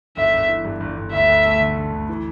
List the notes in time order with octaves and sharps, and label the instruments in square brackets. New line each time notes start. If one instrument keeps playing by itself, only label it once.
[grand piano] G1 [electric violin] E5
[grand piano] G1
E3
G2
G1
G1
[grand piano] D2 [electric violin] E5
[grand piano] D2
A3
D3
D3
D2
E3